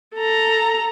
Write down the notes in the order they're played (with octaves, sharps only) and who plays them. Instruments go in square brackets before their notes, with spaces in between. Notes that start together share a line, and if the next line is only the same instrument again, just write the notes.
[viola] A4 A#5